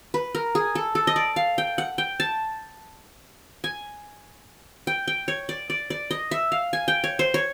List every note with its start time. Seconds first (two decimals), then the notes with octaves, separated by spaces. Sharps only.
0.14 B4
0.35 A#4
0.55 G#4
0.75 A4
0.95 A4
1.07 D#5
1.16 D5
1.36 F5
1.58 G5
1.78 F#5
1.98 G5
2.20 A5
3.64 G#5
4.87 G5
5.08 G5
5.28 C#5
5.49 D5
5.70 D5
5.90 D5
6.11 D#5
6.31 E5
6.52 F5
6.73 G#5
6.88 G5
7.04 C#5
7.19 C5
7.34 C#5